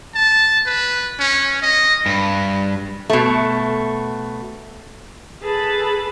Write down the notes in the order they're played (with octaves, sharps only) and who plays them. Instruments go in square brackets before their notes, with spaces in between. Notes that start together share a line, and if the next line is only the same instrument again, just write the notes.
[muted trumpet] A5
B4
C#4
D#5
[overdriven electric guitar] G2
[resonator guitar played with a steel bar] B2 A3
[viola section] G#4 A4 B4 A5 B5